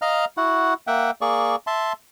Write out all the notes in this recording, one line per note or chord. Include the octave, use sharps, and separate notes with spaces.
D#5 F5 A#5 F6
E4 F#4 F#5
A#3 E5 F#5 G5
A#3 G#4 D5 C#6
E5 A5 C6